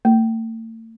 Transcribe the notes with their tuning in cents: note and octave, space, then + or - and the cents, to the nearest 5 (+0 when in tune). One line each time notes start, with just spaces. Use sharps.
A3 +40